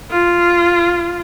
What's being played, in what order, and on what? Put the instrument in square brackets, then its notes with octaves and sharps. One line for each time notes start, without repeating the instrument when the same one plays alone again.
[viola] F4